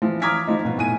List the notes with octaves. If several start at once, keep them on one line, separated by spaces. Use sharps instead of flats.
E3 F3
A#5 D6 D#6 F6 G#6 B6
F3 D#4
B2 B3
A2 G#5 D#7